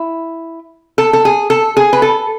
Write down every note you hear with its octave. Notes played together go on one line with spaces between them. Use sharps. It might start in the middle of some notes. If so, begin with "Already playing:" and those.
Already playing: E4
A4
A4
G#4
A4
G#4
B4
A4